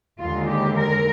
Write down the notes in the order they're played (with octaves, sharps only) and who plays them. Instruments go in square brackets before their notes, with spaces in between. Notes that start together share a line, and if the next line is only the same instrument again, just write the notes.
[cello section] D#2 D3 G#3 F4
G4
A#4